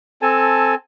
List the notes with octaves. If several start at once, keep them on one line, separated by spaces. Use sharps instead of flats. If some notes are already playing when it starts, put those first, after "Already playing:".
C4 A4 G#5 A5